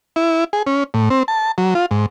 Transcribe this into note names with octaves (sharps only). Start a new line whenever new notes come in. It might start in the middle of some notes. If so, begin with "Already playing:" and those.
E4
G#4
C#4
A2
C4
A5
F#3
F4
G#2